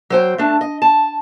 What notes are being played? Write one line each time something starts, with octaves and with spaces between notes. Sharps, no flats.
F#3 C5 G5
A3 D4 A5
D#5
A5